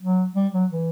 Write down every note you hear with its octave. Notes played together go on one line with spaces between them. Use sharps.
F#3
G3
F#3
E3